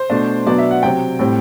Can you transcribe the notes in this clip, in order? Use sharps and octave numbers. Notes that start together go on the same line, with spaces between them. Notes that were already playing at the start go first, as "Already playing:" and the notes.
Already playing: C5
B2 A3 D4
B2 F#3 B3 D4 D5
E5
F#5
C3 F#3 C4 G5
A2 G3 C4